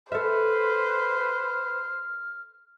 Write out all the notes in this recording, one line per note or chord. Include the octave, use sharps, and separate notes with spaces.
A4 B4 C5 E5 F6